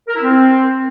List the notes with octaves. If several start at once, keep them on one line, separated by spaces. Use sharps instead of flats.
A#4
E4
C4